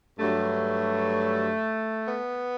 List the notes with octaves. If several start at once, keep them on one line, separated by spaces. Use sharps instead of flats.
G2 F#3 A3
B3